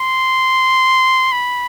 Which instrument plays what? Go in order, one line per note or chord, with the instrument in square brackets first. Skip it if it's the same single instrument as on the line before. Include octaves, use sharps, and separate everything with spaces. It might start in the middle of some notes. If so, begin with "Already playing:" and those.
Already playing: [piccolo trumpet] C6
B5